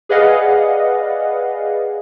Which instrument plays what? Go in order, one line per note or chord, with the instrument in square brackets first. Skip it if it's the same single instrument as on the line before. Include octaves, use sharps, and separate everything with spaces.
[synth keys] G#4 B4 D5 D#5 F5 F#5